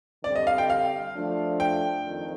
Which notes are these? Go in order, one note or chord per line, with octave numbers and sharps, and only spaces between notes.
D3 G3 C4 D5
D#5
F5
G5
F5
F3 A3 D4
G5
F2 D#3